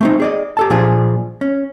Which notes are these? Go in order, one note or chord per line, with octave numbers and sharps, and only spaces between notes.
A3 C4 D#4
G#4 D5 D#5
G4 A4 A5
A#2 F3 D4 F4 G#4
C#4